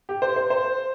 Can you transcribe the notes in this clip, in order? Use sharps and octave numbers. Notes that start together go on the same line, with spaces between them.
G4
C5
C5
C5